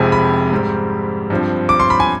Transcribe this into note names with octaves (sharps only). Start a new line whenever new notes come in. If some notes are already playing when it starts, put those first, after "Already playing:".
Already playing: F1 F2 C3 F3 G#3 G#5
B5
G#2 G3 C4
G2 F3 C4
D6
C6
B5
G#5